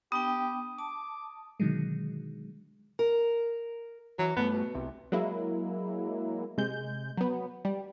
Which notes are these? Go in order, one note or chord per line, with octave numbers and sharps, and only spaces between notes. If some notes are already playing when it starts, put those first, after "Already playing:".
B3 D4 G4 G5 D#6
A5 D6
B2 D3 D#3 F#3 G#3
A#4
E3 F#3
G2 A3 B3
B2
C2 C3
F#3 G#3 A#3 E4
C3 G#3 G6
F#3 B3
G3